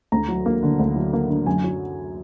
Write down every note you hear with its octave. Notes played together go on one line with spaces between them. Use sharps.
D2 A#5
F#3
A#3
D3
D2
F#3
A#3
D3
F#2 G#5
F#3